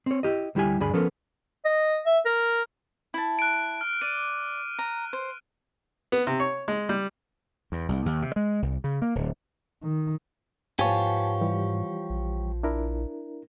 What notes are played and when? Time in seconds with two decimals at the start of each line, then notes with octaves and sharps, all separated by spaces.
0.06 C4 C#5
0.23 E4 G4 D#5
0.55 D2 G3 E4 G4 G#5
0.80 D2 G2 D4 G#4 B5
0.93 F3 B3 C#4 A4 A#4
1.65 D#5
2.06 E5
2.25 A#4
3.14 E4 A5
3.39 F#6 D7
3.81 F6
4.02 D5 D7 D#7
4.79 A#5
5.13 C5
6.12 B3
6.27 C3
6.40 C#5
6.68 G#3
6.89 G3
7.72 E2
7.89 C2
8.06 D#2
8.22 C3
8.36 G#3
8.62 C2
8.84 C#3
9.02 A#3
9.15 D1
9.83 D#3
10.79 G#2 F3 B3 G4 C#5 G#5 A5
11.41 E3 G3
12.10 A#1
12.63 D4 E4 A#4